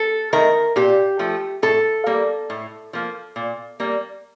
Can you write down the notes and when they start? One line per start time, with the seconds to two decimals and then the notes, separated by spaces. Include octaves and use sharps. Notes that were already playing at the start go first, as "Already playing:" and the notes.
Already playing: A4
0.33 D#3 A3 A#4
0.76 A#2 G4
1.19 F3 A3
1.62 A2 A4
2.06 G3 A#3
2.50 A2
2.93 F3 A#3
3.36 A#2
3.80 G3 A#3